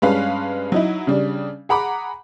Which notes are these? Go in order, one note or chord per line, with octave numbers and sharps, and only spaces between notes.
G2 G#3 C#4 B4 F5
F#3 D#4 E4
C#3 G3 D4
G#4 F#5 A#5 B5 D6